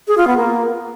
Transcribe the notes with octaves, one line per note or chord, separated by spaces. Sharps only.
G#4
F4
B3
A#3